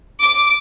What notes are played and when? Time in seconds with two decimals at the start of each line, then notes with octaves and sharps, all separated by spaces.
0.22 D6